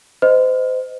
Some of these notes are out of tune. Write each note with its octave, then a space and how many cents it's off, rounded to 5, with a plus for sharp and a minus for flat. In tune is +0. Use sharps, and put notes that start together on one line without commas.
C5 -30 D#5 +0